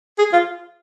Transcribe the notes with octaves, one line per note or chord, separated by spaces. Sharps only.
G#4
F4